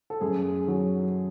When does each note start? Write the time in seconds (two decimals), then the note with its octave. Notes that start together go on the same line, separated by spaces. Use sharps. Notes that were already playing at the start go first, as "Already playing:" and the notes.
0.10 A4
0.21 F#2 G#4
0.67 D#3 F#3